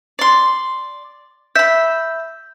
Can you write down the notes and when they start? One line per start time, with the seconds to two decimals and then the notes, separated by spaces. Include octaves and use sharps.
0.19 D5 C6
1.56 E5 B5 G6